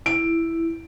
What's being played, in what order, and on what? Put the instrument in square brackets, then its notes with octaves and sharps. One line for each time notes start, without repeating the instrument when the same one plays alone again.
[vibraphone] E4 [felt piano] D7